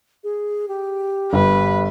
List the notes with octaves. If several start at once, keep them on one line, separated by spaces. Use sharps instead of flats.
G#4
G4
G1 B4